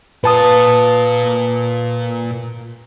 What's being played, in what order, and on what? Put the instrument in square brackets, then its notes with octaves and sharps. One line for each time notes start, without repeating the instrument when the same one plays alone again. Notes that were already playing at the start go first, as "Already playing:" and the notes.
[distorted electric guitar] A#2 F4 [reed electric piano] B4 A5 D#6